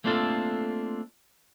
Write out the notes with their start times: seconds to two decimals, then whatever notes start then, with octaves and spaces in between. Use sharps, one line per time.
0.04 A3 A#3 C4 D4 F4 A4